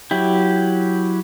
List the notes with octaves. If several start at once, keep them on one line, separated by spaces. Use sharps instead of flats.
F#3 E4 G4